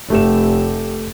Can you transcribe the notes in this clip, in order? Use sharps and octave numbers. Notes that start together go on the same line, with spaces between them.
F1 A3 G4 E7